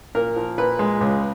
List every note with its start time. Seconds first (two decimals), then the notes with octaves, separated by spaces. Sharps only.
0.15 A#2 A#4
0.36 F3
0.58 A#2 B4
0.79 G#3
1.01 C#2